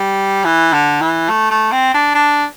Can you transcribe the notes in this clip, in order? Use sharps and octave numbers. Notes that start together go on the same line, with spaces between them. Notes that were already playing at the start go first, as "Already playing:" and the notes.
Already playing: G3
E3
D3
E3
A3
A3
C4
D4
D4